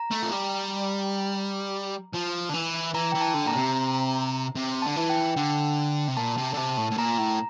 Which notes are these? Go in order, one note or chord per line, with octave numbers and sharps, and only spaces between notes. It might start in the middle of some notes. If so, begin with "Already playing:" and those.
Already playing: A#5
A3
F3
G3
F3
D3
E3
E3 A#5
E3 G5
A5
D3
A#2 A#5
C3
C3
D3 A5
E3
G5
D3
C3
A#2 A5
C3
D3
C3 A5
A2
A2
A#2 A#5
A2